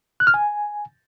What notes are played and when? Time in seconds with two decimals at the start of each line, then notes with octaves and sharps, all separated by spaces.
0.20 F#6
0.27 F6
0.34 G#5